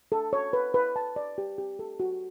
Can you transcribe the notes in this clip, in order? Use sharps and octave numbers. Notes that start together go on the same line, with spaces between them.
A4
C#5
B4
B4
A5
D5
G4
G4
A4
F#4